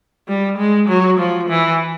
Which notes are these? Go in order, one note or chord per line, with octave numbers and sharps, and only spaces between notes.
G3
G#3
F#3
F3
E3